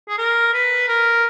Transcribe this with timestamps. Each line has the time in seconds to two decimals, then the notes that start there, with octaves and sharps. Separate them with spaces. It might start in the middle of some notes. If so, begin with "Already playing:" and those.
0.08 G#4
0.18 A#4
0.53 B4
0.88 A#4